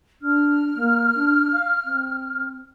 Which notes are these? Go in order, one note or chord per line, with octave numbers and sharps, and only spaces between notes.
D4 F6
A#3
D4
F5
C4